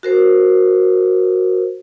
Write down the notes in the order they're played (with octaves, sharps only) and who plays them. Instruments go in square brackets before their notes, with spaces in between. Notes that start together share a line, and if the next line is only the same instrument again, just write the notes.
[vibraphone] F#4 A#4 C5